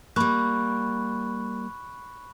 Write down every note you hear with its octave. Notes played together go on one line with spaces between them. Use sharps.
G3 A#3 B5 C#6 F#6